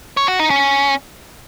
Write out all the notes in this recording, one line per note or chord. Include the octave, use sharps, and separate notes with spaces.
C#5
F#4
D#4
C#4